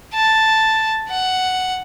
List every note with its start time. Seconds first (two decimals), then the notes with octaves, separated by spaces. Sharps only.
0.13 A5
1.09 F#5